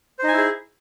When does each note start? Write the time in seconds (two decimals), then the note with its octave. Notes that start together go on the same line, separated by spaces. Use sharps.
0.19 C5
0.24 D#4
0.28 G#5
0.33 E4
0.37 G#4